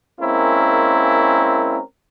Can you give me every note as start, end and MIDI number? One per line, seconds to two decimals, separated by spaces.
0.21 1.80 56
0.21 1.80 58
0.21 1.80 60
0.21 1.80 61
0.21 1.80 64
0.21 1.80 70